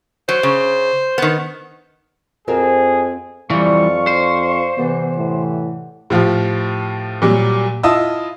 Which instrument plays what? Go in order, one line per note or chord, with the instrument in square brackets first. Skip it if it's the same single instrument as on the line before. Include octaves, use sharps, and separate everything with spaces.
[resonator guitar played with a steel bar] F#3 [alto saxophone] C5
[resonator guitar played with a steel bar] C#3
D#3 B3
[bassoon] F2 [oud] C4 F#4 A#4 [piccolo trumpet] G#4
[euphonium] F2 [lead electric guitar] E3 G3 [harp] D5 C6 [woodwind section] F5 C#6
[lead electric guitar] C5
[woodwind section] C3 E3 [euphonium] B3 [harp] G4 A4 F#5
[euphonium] A2
[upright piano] A2 F3 F4 G4
A#2 F#3 G3
E4 F4 D#5 A5 D#6 E6